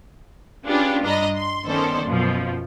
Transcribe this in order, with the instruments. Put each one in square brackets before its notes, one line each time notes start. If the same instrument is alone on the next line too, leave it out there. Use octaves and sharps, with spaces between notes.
[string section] C#4 D4 F4 G4 G#4 B4
G2 D4 D#5 A#5 B5
C6
D#3 B3 C#4 A4 C5 D5
F#2 B2 F3